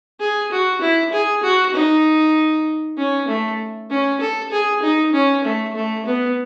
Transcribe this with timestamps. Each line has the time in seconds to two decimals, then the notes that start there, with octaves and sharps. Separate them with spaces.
0.20 G#4
0.52 F#4
0.82 E4
1.12 G#4
1.43 F#4
1.75 D#4
2.98 C#4
3.28 A3
3.90 C#4
4.20 A4
4.52 G#4
4.83 D#4
5.13 C#4
5.44 A3
5.76 A3
6.06 B3